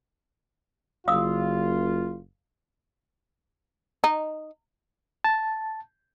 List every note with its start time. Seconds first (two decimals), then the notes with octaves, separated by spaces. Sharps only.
1.08 F#1 F4 F5 D#6 E6
4.04 D#4
5.24 A5